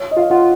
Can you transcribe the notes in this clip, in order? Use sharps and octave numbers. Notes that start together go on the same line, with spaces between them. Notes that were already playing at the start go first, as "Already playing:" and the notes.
Already playing: C#5
D#5
F4 F5
F4 F#5